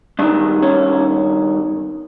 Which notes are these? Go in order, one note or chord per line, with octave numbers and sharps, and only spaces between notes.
G2 D#3 D4
C#4